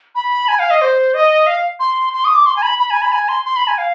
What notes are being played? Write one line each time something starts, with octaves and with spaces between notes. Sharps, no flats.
B5
G#5
F5
D#5
C5
D#5
F5
C6
C6
D#6
D6
C6
G#5
B5
B5
G#5
B5
G#5
C6
C6
B5
G#5
F5